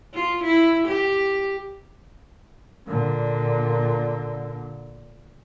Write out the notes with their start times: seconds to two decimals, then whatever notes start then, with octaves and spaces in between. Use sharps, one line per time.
0.14 F4
0.44 E4
0.88 G4
2.87 A#2 D3